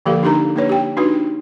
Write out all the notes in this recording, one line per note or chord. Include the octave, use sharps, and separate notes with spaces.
D3 F3 A#3 G4 A4 F5
D4 D#4 G4 A#4 A#5
A#3 D4 B4 C#5
G4 G5
D4 D#4 F#4 B4